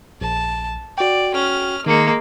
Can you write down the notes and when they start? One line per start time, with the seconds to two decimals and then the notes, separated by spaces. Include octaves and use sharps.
0.21 A#1 A5
0.98 F#4 D5 G5
1.34 C#4 F6
1.86 D#3 G#3 A#3 C#7